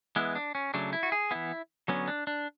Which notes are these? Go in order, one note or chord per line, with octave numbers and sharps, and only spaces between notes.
E3 G#3 B3 E4
D4
C#4
C#3 F#3 A3 D4
E4
F#4
G#4
E3 B3 E4
D3 F#3 B3 C#4
D4
D4